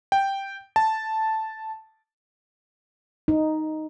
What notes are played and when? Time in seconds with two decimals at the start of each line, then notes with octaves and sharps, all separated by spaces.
0.12 G5
0.76 A5
3.28 D#4